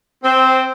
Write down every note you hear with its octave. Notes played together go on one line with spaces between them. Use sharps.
C4